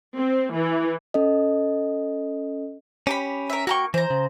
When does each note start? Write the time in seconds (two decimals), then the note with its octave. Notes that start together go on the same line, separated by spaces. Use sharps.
0.17 C4
0.53 E3
1.14 C#4 A4 D#5
3.07 C#4 G4 A#5 B5
3.50 A#4 E5
3.67 A#3 F#4 G5 A#5 C#6
3.94 E3 C5 A#5
4.10 C#3